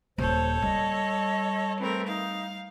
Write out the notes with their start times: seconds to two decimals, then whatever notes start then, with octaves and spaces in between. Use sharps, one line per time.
0.18 D#1 A4 C5 C#5
0.62 G3 D#5
1.79 E3 A3 C4 A#4
2.07 D#4 F5